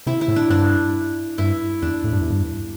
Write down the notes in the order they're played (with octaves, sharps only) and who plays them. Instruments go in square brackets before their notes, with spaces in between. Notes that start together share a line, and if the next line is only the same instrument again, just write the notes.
[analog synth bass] C3 [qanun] E4
[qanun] E4
[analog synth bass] A2
[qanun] D4
[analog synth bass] G2 [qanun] D4
[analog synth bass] G2 [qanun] E4
[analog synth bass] E2 [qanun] D4
[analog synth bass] A2
G2
E2
G2